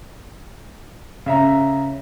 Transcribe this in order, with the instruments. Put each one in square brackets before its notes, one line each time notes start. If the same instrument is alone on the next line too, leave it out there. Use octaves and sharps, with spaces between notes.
[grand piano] C#3 E5 A#5